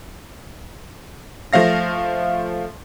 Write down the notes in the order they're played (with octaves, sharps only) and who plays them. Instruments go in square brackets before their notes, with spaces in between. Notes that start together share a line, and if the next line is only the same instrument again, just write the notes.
[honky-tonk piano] F3 A3 F5 A#6